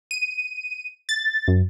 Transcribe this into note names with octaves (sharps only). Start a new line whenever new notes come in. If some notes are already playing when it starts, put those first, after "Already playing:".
D#7
A6
F#2